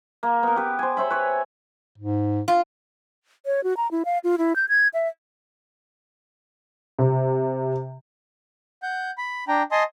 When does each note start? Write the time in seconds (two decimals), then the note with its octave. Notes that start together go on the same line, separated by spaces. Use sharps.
0.23 A#3
0.43 B3 A#4
0.56 G4 B4
0.79 C5 G#5
0.97 C5 C#5 E5 B5
1.10 B4 C#5
1.98 G#2
2.48 F4
3.46 C#5
3.64 F#4
3.77 A#5
3.91 E4
4.05 F5
4.24 F4
4.38 E4
4.56 G6
4.69 G#6
4.94 E5
6.99 C3
8.83 F#5 G6
9.18 B5
9.48 D4 G5 A#5
9.72 D#5 G#5 A5 C6 D#6